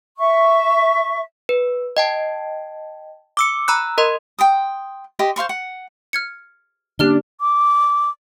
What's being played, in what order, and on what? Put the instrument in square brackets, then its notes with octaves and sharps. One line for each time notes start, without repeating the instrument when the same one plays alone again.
[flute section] E5 C#6
[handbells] B4
D#5 G5 A5
D6 E6 C#7
A#5 B5 E6 F#6
A#4 D#5 C6
[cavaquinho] G5 C6 D#6
G4 D#5 C6
C5 F5 C6 C#6
F#5
[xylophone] F6 G#6 C#7
[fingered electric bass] D3 A#3 C#4 [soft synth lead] D4 [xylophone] G4 F6 G7
[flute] D6